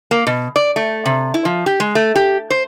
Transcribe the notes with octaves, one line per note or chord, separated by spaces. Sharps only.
A#3
B2
D5
A3
C3
E4
F3
G4
G#3
A3
G4
C5